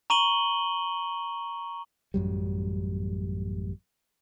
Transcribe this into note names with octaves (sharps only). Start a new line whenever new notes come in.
A#5 C#6 D#7 F#7 G7
A1 F#2 F#3 G3